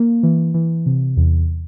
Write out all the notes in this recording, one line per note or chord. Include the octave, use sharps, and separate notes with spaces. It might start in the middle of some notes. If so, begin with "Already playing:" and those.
Already playing: A#3
E3
E3
C3
E2